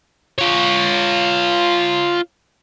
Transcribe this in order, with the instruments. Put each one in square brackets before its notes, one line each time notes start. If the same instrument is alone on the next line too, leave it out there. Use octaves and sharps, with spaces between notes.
[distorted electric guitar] F4 C#5